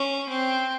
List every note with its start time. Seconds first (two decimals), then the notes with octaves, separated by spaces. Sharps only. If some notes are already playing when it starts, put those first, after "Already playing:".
Already playing: C#4
0.29 C4